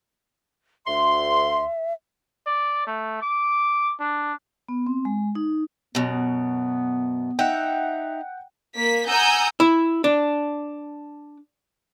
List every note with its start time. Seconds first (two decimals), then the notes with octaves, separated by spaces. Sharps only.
0.87 D2 E5 C6
2.46 D5
2.87 A3
3.22 D6
4.00 D4
4.68 B3
4.87 C4
5.05 G#3
5.35 D#4
5.95 F#2 B2 B3
7.39 D#4 E5 F#5 G5
8.76 A#3 B6
9.08 F#5 G#5 A#5 D#6 E6 G6
9.60 E4
10.04 D4